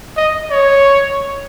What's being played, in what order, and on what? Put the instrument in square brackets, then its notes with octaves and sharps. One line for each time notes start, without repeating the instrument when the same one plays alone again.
[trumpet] D#5
C#5